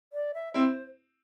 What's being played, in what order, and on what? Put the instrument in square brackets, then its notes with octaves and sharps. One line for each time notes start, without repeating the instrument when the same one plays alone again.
[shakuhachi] D5
E5
[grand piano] C4 E4 [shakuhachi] C5